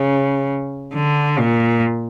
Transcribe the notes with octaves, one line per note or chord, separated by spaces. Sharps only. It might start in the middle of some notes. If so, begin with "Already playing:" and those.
Already playing: C#3
D3
A#2